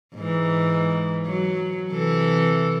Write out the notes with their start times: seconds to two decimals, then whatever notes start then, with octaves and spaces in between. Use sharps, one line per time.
0.15 G#2 E3
1.26 F#3
1.91 C3 E3 A4